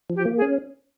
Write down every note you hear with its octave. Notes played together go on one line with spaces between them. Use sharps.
F3
G4
A#3
G#4
C#4